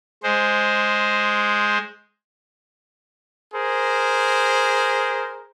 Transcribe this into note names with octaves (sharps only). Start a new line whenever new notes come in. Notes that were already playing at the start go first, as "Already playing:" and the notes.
G#3 C5
G#4 A#4 C5